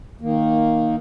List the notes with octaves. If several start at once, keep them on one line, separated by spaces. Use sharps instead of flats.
D#3 A#3